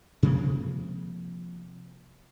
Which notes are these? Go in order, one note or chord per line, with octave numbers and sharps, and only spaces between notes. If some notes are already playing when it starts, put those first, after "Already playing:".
C3 F3 G#3 A#3